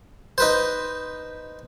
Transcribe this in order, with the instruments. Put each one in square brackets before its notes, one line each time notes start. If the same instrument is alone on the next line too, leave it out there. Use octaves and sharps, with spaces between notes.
[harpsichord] D#4 B4 C5